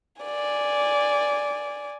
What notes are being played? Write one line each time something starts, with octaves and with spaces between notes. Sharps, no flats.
D5 G#5